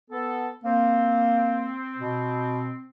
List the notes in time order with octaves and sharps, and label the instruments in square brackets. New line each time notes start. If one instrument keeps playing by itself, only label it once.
[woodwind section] B3 A4
[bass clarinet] A#3 [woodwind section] C4
[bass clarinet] B2